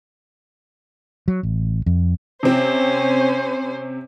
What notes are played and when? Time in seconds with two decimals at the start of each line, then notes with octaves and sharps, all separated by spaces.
1.28 F#3
1.43 A1
1.86 F2
2.43 C3 C4 C#4 C5